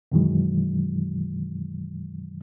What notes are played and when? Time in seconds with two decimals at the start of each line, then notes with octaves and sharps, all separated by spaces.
0.12 F#2 B2 D#3 E3 F#3 G#3